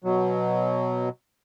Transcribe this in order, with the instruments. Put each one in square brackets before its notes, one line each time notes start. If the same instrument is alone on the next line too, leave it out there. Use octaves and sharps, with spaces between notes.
[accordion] B2 F#3